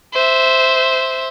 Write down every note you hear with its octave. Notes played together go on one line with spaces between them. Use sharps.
C5 E5